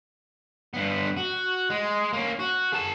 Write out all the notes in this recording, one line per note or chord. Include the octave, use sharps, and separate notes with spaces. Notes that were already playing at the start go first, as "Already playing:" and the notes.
G2 B3
F#4
G#3
A#3 C#4
F#4
G#4 A5